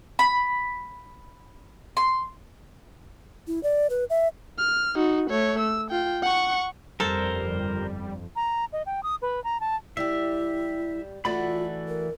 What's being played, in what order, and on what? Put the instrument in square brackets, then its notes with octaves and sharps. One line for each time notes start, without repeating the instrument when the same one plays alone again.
[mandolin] B5
C6
[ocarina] E4
D5
B4
E5
[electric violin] F6
D#4 F#4
A3 C#5
E6
F4 G5
F#5 C#6
[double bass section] G1 F2 F3 [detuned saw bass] G3 [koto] A4 [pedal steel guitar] A#4 C5
[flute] A#5
D#5
G5
D#6
B4
A#5
A5
[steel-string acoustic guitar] G3 G4 [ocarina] E4 [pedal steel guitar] E5
[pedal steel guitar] E3 D5 B5 [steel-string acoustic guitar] A3 F#4 A4 [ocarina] F4
[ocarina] A#4